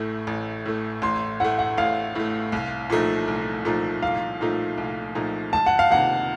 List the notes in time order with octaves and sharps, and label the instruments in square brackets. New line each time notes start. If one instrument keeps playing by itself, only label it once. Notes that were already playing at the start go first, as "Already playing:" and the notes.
Already playing: [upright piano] A1 A2 A3
A1
A2 A3
[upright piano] A1 [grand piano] C6
[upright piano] A2 A3 [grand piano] F#5
[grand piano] F#5
[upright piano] A1 [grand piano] F5
[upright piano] A2 A3
C2
A#2 F3 A3 D#4
C2
A#2 F3 A3 D#4
[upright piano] C2 [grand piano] F5
[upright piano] A#2 F3 A3 D#4
C2
A#2 F3 A3 D#4
[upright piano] C#2 [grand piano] A5
[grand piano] F#5
F5
[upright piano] C3 D#3 A#3 F4 [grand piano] F#5